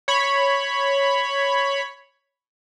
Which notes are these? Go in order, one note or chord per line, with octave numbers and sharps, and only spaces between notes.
C#5 B5